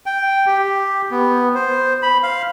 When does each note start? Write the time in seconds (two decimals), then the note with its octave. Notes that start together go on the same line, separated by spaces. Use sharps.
0.06 G5
0.46 G4
1.11 B3
1.55 C5
2.02 B5
2.23 F5